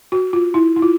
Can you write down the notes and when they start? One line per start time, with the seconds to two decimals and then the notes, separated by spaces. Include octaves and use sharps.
0.12 F#4
0.33 F4
0.54 E4
0.77 E4
0.82 F4